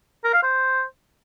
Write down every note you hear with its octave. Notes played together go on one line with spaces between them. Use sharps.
A#4
F5
C5